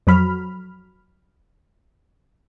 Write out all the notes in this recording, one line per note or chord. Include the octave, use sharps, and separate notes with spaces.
F2 F#3 B5 F6